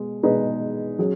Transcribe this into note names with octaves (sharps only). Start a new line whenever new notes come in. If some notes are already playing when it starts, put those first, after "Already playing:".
Already playing: B2 G#3
B2 G#3 D#4 G#4 B4
F#3 C#4 G#4